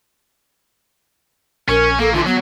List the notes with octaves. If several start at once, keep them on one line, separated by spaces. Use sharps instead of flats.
A#1 C#4 A#4 C#6 C#7
A#3 A4
D3 E3 F4
F#3 B3